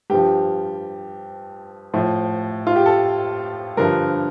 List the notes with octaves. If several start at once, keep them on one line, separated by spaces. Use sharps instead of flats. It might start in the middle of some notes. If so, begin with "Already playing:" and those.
G2 F3 G4
A2 F3
F4
G4
A4
G2 D3 F3 A#4